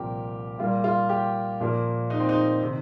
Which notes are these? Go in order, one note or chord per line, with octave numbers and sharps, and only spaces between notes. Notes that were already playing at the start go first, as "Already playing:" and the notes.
Already playing: C2 A#2 F3 A#3 G4 A#4
A#2 G3 A#3 F4
F4
G4
A#2 F3 A#3
D#4
C4
D#4
C3 D#3